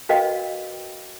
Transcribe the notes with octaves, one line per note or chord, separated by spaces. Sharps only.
F#4 A#4 B4 D#5 F5 G5